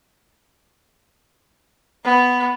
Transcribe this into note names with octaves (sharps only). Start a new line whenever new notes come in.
B3